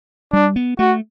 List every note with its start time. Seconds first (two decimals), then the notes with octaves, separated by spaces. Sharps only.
0.33 G3 D4
0.56 B3
0.79 A3 F#4